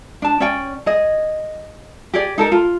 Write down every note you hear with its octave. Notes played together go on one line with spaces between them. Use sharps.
D4 A5
C#4 D5 G5 G#5
G#4 D#5
G4 G#4 D5
D#4 A4 A#4
F4